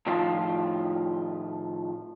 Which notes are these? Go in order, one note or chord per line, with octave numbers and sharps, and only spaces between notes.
A2 D#3 F3 F4